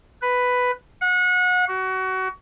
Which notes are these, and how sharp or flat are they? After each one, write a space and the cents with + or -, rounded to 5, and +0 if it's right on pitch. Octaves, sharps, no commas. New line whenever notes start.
B4 +5
F#5 -30
F#4 +25